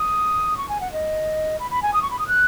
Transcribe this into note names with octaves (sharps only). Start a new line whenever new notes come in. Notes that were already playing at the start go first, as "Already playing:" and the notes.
Already playing: D#6
C#6
G#5
F#5
D#5
B5
B5
G#5
D#6
C#6
B5
D#6
F#6